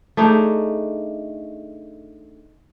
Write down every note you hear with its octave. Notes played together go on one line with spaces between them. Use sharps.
A3 D4 D#4 G#4